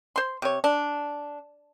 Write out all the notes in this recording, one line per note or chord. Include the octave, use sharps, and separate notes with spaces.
C5 C6
C3 C#5
D4